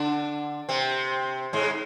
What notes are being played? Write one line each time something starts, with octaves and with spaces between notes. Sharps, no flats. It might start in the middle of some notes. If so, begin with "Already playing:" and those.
Already playing: D3 D4
C3 C4
G#2 G#3